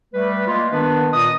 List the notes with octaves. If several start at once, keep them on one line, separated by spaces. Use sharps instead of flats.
G3 A3 B4
G#3 A#3 F4
D#3 B3 D4 B4
A#2 D#5 D#6